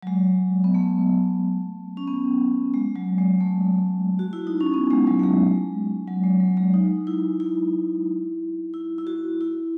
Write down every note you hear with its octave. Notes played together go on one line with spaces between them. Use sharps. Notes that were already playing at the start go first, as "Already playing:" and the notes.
F#3
G#3
B3
A3
C#4
B3
G#3
F#3
G#3
A3
F#4
E4
D#4
C#4
B3
G#3
F#3
A3
G#3
F#3
G#3
F#3
G#3
D#4
E4
E4
E4
E4
F#4
E4